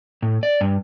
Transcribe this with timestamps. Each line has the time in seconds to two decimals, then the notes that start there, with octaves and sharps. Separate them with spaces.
0.23 A2
0.43 D5
0.61 G2